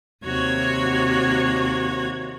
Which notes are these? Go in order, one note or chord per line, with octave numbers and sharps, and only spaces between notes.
D#2 C3 F#4 C#5 F#6 G#6